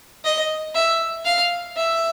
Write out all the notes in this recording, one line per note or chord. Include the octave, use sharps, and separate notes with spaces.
D#5
E5
F5
E5